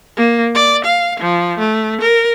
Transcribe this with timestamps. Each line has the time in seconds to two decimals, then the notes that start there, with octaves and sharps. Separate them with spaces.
0.17 A#3
0.55 D5
0.85 F5
1.20 F3
1.59 A3
2.01 A#4